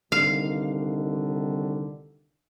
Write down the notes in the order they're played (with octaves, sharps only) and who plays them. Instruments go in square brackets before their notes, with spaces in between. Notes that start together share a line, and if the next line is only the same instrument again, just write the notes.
[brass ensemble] C2 D3 D#3 [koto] F5